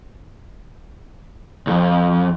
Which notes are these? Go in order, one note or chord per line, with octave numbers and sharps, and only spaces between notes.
C2 F2